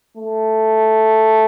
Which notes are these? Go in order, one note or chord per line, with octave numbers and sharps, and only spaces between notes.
A3